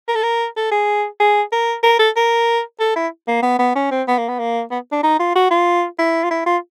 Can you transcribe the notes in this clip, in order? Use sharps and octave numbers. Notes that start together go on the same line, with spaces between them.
A#4
A4
A#4
A4
G#4
G#4
A#4
A#4
A4
A#4
A4
E4
A#3
B3
B3
C#4
C4
B3
A#3
B3
A#3
B3
D4
D#4
F4
F#4
F4
E4
F4
E4
F4